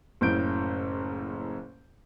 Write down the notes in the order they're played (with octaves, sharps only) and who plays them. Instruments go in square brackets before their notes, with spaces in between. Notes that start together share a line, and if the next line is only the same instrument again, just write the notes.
[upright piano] F#1 A2 C#3 G6 D7